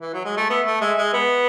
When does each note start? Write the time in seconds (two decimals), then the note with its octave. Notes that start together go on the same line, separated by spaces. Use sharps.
0.01 E3
0.13 F#3
0.25 G#3
0.37 A3
0.50 B3 E5
0.67 A3
0.81 G#3 E5
0.98 G#3
1.14 B3 B4